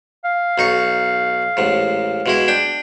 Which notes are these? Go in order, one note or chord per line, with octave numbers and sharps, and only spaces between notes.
F5
B1 D#4 C#6
A1 G#2
B2 G#3 E4
D4 G5